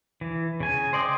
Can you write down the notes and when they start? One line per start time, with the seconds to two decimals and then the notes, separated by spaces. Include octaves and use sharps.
0.21 E3
0.60 C#3 G#5
0.93 C5 D5 D#5 G5 D6